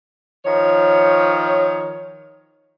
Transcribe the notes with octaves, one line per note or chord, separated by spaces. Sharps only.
D#3 F3 C#5